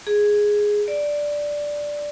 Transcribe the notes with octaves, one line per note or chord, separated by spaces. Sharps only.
G#4
D5